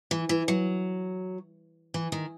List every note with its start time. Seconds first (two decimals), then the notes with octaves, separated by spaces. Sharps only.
0.11 E3
0.29 E3
0.48 F#3
1.94 E3
2.12 D#3